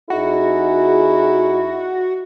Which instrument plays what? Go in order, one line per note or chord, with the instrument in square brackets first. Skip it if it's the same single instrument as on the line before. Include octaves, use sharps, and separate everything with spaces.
[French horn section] F2 D#4 G#4 [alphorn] E4 [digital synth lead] F#4